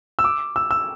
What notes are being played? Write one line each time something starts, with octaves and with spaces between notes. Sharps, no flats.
E6
D6
E6
E6